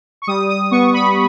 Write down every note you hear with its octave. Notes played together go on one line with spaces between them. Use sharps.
C#6
G3 D#6
D#6
B3 C#6
B5